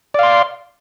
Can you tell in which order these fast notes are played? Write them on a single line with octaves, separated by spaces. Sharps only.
D5 F5 C6